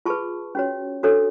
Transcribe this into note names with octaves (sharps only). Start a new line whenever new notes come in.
F4 G#4 B4 A5 C#6
C#4 F#4 C#5
D4 F#4 A4 C#5